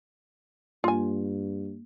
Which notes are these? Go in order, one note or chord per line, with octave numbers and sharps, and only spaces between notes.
G2 A#3 F4 G#5